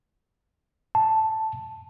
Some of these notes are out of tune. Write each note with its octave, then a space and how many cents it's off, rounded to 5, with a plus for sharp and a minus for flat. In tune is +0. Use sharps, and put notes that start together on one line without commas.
A5 +0